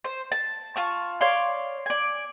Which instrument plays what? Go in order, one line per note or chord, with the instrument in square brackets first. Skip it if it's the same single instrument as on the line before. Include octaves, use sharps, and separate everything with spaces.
[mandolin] C5
A5
F4 A5 C#6
C#5 D5 F5 C6
D5 G#5